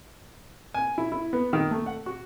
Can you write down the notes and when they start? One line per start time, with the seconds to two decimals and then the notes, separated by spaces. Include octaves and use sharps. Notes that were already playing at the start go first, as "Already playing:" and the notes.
0.74 G#5
0.98 E4
1.12 E4
1.33 B3
1.53 D#3
1.71 A3
1.86 F#5
2.06 F#4